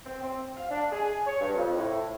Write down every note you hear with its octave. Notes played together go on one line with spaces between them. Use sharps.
C4
C4
F5
D4
G#4
C#5
G2
F2
A2